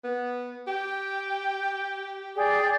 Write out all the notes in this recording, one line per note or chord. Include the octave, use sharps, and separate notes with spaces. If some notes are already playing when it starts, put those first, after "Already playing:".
B3
G4 G5
G#4 D5 G5